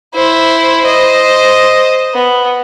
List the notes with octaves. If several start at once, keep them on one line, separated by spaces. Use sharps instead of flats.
E4 C5
C5 D#5
B3